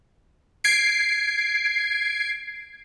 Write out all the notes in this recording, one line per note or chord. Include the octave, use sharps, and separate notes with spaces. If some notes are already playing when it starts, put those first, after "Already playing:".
G#6 C7 D7